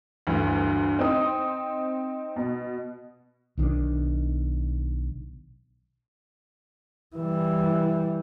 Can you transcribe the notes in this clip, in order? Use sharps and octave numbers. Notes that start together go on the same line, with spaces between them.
D2 G2 D3 E3
C4 D#4 D#6
B2
B1 D#3 C#4 D4
E3 G3